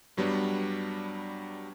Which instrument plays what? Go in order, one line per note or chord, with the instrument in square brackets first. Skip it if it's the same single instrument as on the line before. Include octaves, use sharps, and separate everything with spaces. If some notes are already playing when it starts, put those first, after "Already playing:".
[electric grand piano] G2 F#3 G3 B3 D4